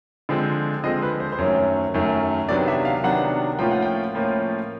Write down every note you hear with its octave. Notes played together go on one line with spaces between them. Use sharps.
D3 F3 G#3 C4
D3 F3 G#3 C4 D#5
B4
C5
C5
F#2 D#3 F#3 A3 C#4 C#5
F#2 D#3 F#3 A3 C#4
C3 D#3 F#3 B3 D4 D5
E5
F5
C3 D#3 F#3 B3 D4 F#5
A2 F3 A#3 C#4 F4 G5
F#5
G5
A2 F3 A#3 C#4 F4